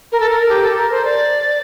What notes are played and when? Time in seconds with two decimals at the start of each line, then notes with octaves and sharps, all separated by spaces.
0.12 A#4
0.20 A4
0.30 A#4
0.49 G4
0.63 A4
0.77 A#4
0.91 C5
1.05 D5